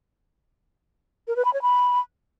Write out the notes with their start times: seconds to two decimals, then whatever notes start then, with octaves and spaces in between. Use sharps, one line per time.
1.28 A#4
1.36 B4
1.45 B5
1.53 C#5
1.62 B5